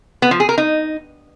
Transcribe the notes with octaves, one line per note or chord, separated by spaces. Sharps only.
B3
F3
G#4
A#4
D#4